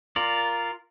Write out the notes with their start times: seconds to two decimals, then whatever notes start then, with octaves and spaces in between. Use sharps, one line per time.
0.16 F4 A#4 D5